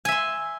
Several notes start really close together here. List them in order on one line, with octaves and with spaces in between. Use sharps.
G#5 E5 C6